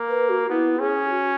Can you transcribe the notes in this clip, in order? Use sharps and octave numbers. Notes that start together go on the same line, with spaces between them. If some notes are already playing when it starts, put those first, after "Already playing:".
Already playing: A#3
B4
F#4
B3 E4
C#4 G#4
F#4